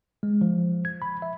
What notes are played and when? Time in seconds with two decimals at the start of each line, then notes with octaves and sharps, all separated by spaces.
0.23 G#3
0.41 F3
0.85 G#6
1.02 B5
1.22 E5